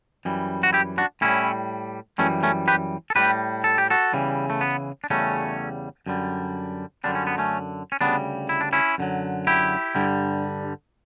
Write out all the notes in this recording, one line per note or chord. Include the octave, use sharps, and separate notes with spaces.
F#2 E3 G3
F#4
E4 G4
D4 F#4
A2 G3 C#4 E4
F#2 E3 G3 A3 C#4
A3 C#4
G4 B4
A4
A2 G3 G4 B4
A4
G4
F#4 A4
E2 C#3 E3 G3
A3
B3
D4
E2 C#3 G3 A3 C#4
F#2 D3 G3
F#2 D3 G3 D4
C#4
B3
A3 C#4
C#4
D2 C#3 G3 B3 D4
E4
D4
C#4 E4
F#2 D3 F#3
E4 G4
G2 D3 G3